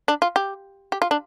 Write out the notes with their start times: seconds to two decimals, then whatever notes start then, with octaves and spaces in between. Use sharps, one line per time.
0.08 D4
0.22 F4
0.36 G4
0.92 G4
1.02 F4
1.11 D4